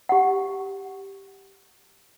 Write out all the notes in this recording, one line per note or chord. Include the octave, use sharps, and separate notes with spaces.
G4 F#5